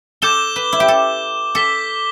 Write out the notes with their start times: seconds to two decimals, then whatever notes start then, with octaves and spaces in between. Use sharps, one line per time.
0.22 A4 D6 G6 E7 G7
0.56 B4
0.73 E4
0.80 G4
0.88 A4
1.55 A4 D6 B6 G7